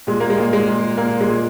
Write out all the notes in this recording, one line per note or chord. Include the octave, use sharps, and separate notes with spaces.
A#2 G#3
A#3
G#3
A#2
G#3
A#2
A#2 A#3
G#3
A#2